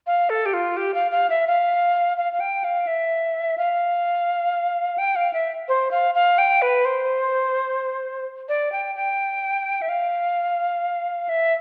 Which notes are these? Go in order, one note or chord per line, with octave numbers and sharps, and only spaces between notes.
F5
A4
G4
F4
G4
F5
F5
E5
F5
F5
F5
G5
F5
E5
F5
G5
F5
E5
C5
F5
F5
G5
B4
C5
D5
G5
G5
E5
F5
E5